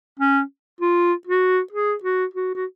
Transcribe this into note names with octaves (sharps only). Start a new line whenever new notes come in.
C#4
F4
F#4
G#4
F#4
F#4
F#4